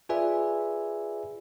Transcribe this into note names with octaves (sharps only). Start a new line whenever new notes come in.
F4 G#4 B4 D5 E5 G#5